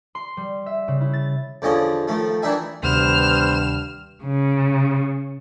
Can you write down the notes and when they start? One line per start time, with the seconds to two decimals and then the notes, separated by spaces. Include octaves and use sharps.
0.15 C6
0.37 G3
0.66 E5
0.88 C#3
1.01 E4
1.13 A6
1.62 E2 D3 F3 C#4 D#5
2.08 D#3 F3 A3
2.42 D#3 E3 D4 D#4 E5 G#5
2.83 D2 G2 C3 D#3 B3 C5 F6 E7
4.23 C#3